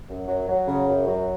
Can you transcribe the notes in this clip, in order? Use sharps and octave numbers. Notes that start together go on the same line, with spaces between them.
F#2
F#3
F#3
C#3
F#2
F#3